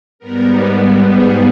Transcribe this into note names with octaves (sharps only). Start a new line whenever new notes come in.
G#2 G3 B3 A#4
G#4